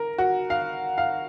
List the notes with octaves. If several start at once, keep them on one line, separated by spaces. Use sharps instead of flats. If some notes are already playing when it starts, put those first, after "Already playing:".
Already playing: A#4
F#4
F5
F5